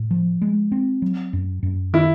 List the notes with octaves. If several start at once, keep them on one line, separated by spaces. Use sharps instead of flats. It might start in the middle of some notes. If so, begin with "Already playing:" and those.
Already playing: A2
F3
G#3
C4
F#3
F#2
F#2
D#3 E4